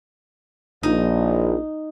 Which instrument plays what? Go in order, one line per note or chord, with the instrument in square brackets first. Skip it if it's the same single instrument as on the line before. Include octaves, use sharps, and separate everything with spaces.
[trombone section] A#1 [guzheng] D#4